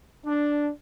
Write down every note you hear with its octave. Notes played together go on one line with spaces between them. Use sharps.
D4